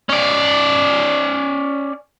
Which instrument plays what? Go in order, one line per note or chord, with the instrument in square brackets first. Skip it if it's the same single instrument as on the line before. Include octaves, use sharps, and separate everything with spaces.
[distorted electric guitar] C#4 D5